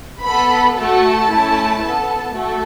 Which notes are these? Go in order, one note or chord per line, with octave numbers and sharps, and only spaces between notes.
B3 A4 B5
A3 F#4 A4 A5
A3 C#4 E4 A4
B3 A4
A3 F#4 A4